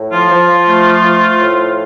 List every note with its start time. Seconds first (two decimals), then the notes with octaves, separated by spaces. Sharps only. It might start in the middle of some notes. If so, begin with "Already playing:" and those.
Already playing: A2
0.11 F3 F4
0.29 F3
0.67 A3
1.04 F3
1.41 A2